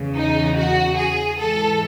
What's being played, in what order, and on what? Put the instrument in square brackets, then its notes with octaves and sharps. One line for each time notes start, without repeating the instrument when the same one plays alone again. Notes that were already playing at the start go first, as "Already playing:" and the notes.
Already playing: [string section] E2 C#3 E3
D#4
F#4
G#4
G#2 E3 A4